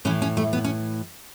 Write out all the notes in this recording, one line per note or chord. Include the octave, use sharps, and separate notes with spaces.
A2 E3 C#4
C#4
A3
B3
C#4